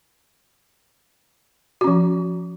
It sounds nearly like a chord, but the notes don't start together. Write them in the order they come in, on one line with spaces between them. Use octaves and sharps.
F#4 C#4 F3